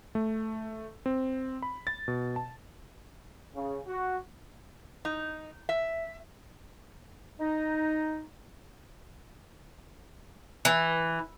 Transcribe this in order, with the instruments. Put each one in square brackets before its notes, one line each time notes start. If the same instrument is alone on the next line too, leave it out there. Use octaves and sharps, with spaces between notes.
[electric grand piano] A3
C4
B5
A6
B2
A5
[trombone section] C#3
F#4
[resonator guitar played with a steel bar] D#4
E5
[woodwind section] D#4
[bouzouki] E3